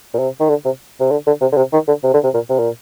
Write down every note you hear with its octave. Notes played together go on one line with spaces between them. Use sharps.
A#2
C3
D#3
D3
C3
C3
D3
D3
C3
D3
C3
D#3
D3
C3
D3
C3
A#2
C3
A#2